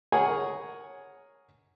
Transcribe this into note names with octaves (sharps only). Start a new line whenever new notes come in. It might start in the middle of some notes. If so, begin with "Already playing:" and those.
G#4 A#4 C#5 F#5 G#5